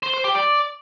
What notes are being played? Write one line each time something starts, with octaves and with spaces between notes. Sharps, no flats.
C5
C5
G4
D5